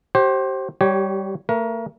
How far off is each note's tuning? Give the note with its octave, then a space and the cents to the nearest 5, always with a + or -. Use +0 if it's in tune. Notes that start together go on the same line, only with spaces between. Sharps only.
G4 -30 C5 +25
G3 +0 G4 -25 C#5 +0
A3 +40 A#4 +30